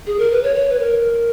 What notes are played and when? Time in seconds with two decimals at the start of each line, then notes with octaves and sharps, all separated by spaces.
0.07 G#4
0.19 A#4
0.31 B4
0.43 C#5
0.55 C#5
0.70 B4
0.79 A#4